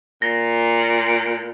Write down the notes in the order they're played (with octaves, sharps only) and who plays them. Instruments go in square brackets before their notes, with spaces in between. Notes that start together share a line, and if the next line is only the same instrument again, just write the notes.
[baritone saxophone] A#2 [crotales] A#6